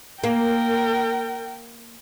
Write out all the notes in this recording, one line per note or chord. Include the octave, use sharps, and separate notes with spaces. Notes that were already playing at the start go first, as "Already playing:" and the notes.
A#3 A#4 G5